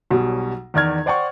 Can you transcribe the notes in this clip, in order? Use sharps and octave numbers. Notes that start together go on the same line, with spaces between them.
B1 B2 F#3 G3
E2 D#3 D5 F6 G#6
C5 D5 F#5 G5 C#6